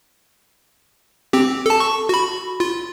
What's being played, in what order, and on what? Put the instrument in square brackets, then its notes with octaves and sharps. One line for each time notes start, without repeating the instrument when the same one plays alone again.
[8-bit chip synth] C4 G4
A4 A5
C#6
F#4 B5
F4